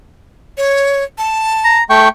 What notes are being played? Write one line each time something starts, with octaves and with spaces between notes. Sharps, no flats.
C#5
A5
A#5
A3 G5 C#6